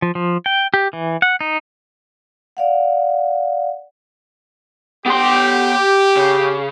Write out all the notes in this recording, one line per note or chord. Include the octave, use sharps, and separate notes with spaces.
F3
F3
G5
G4
E3
F#5
D#4
D5 F5 F#5
B3 G4 C6
C#3